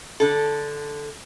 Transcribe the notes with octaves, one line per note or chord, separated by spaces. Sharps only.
D3 A4